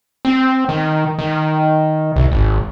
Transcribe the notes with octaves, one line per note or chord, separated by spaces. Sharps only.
C4
D#3
D#3
C2
G#1